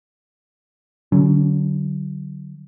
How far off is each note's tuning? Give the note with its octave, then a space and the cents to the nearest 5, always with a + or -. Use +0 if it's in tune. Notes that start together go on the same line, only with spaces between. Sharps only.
D3 +0 F#3 +25 C#4 +35